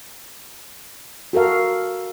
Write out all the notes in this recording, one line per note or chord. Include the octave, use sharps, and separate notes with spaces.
F#4 A4 A#4 F5